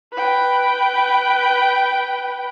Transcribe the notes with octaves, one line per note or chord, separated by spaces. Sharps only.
B4 G5